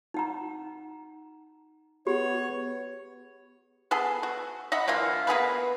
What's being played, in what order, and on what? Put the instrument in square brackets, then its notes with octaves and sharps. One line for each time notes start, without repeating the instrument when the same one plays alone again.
[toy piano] D#4 F#5 A#5
[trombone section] B3 [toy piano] G4 G#4 [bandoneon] C#5
[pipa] B3 G#4 A4
F#4
D#5 E5 F#5 B5
D3 E3 A#3 F4
A#3 B3 G#4 B4